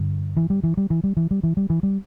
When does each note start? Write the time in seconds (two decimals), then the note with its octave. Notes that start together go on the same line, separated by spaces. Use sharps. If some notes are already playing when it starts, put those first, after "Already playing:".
Already playing: G2 D3
0.37 E3
0.50 G3
0.63 E3
0.77 G3
0.90 E3
1.04 G3
1.17 E3
1.31 G3
1.43 E3
1.57 G3
1.70 E3
1.83 G3